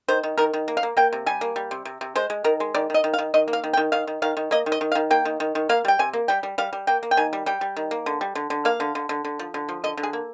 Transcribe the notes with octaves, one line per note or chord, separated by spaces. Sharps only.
D#3 C5
D#3
D#3 A#4
D#3
A#3
F5
A#3
A#3 G5
C3
G3 G#5
A#3
G3
C3
C3
C3
G#3 C5
G#3
D#3 A#4
G#3
D#3 D5
D#3 D#5
D#3
F5
D#3
D#3 D#5
A#3
F5
D#3
G5
D#3
D#3 F5
D#3
D#3 F5
D#3
A#3 D#5
D#3
D#5
D#3
F5
D#3
A#3 G5
D#3
D#3
D#3
A#3 F5
G3 G5
C3 G#5
A#3
G3 G5
G3
G3 F5
G3
A#3 G5
A#3
G5
D#3 G#5
G3
G3 G5
G3
D#3
A#3
D3
G3
D3
D3
A#3 F5
D3
D3
D3
D3
F3
D3
F3
D3 D#5
D3
G#4
A#3